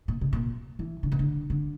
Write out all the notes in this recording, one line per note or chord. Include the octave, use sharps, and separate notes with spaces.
A#2
C3
A#2
E3
D3
C3
D3
D3